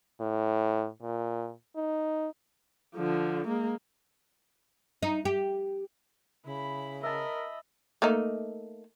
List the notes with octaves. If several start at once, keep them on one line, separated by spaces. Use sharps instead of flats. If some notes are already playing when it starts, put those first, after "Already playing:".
A2
A#2
D#4
D3 F3
G#3 A#3
D#4
G4
C#3 E4 B5
A#4 D#5 E5 A5 B5
A3 A#3 D#4